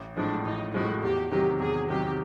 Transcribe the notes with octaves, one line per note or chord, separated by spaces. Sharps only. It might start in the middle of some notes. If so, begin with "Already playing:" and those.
Already playing: A1
A2 F3 G#3 D4
A1 D#4
A2 F3 G#3 F#4
E2 G4
C3 D#3 F#3 G4
E2 G#4
C3 D#3 F#3 G4